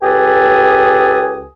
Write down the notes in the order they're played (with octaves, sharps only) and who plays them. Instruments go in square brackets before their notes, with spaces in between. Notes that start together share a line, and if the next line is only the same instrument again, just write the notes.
[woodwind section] C#2 G4 A4 B4 G#5 D#6